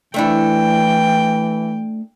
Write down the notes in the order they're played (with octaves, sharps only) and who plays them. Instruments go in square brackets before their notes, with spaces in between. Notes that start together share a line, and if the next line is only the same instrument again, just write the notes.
[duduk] E3 [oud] A3 D4 E4 [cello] G5